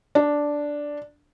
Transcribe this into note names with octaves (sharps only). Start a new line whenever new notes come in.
D4